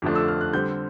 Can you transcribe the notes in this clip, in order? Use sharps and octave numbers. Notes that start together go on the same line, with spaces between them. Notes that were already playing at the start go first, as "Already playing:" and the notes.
F2 D3 F3 A3 D4
E6
F6
F#6
D3 G3 C4 G6